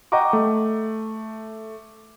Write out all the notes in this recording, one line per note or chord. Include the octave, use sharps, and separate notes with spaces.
D#5 F#5 G5 A#5 C#6 D6
A3